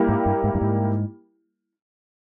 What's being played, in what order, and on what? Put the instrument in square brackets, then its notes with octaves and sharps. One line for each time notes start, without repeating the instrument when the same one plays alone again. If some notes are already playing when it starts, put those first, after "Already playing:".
Already playing: [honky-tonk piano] G3 A#3 E4 G4
[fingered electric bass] G#2
G2
G#2
G2
G#2